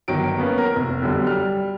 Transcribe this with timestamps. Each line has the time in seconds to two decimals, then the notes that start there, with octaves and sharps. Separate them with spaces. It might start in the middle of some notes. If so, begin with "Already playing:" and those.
0.08 G1 D#3 F#3 D7
0.38 A#3 B3 C#4
0.58 A#4
0.76 F1
1.02 B1 F#2 D3 G3
1.24 G3 F6